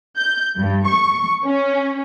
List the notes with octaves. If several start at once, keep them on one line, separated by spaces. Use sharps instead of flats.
G6
G2
C#6
C#4